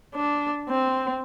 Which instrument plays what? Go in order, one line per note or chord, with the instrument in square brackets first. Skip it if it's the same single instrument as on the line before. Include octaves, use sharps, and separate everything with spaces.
[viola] D4
C4